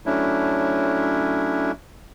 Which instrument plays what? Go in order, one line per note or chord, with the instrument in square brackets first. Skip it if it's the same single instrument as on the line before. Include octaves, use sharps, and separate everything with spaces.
[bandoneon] F#3 A3 C#4 D4 E4